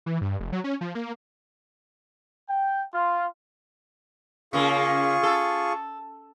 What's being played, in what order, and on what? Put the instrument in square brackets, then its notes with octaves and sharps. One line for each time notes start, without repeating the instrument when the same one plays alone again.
[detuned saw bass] E3
G2
F1
F#3
C#4
F3
A#3
[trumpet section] G5
F4
[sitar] C#3 A#3 [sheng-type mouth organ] F4 G#4 C#6
[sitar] A4